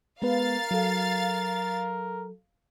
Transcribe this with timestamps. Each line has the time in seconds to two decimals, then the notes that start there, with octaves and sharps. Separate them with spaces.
0.22 G#3 B3 A#4 B4 F5 A6
0.71 F#3 A4